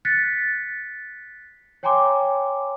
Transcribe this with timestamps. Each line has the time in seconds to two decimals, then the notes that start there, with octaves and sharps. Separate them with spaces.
0.05 F#6 A6 B6 C#7
1.83 C#5 G5 G#5 A#5 C6 D6